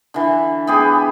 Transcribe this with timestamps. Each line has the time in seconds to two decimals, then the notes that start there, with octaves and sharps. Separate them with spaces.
0.14 D3 E3
0.67 B3 G4 G#4